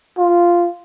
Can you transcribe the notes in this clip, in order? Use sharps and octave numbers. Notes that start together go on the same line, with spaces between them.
F4